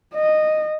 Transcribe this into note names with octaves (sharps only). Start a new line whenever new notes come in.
D#5